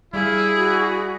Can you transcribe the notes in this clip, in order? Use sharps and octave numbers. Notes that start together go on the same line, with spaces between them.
G3 E4 G#4 F5
F#4